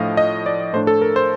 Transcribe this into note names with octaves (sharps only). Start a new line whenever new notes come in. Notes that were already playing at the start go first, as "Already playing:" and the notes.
Already playing: A2 F3 A3 D4 D#5 F5
D#5
D5
A2 A3 D4 C5
A4
A#4
C5